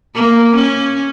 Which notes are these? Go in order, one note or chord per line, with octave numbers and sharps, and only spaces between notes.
A#3
C#4